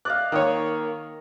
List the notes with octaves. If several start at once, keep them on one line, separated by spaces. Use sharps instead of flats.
D5 D#5 F5 F#6
D#3 A#3 A#4 C#5 D#6